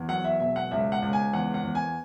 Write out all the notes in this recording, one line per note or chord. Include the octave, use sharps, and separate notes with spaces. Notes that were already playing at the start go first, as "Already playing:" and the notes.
Already playing: E2
F#3 F#5
E5
E1 E5
F#5
C#2 E5
F#5
C#2
G#5
E2 F#5
F#5
E2
G#5